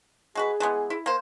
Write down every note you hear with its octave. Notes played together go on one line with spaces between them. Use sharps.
G#3 F#4 G#4 B4
E3 G#3 B3
E4
A#3 C5